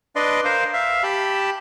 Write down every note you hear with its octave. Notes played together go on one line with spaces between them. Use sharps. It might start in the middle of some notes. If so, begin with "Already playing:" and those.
D4 B4 D5 D#5 C6
A#4 C5 F5
E5 F5
G4 A5 B5